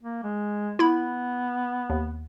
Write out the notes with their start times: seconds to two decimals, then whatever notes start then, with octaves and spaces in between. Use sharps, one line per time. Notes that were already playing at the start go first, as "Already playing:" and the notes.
0.03 A#3
0.23 G#3
0.79 B3 E4 B5
1.90 D#2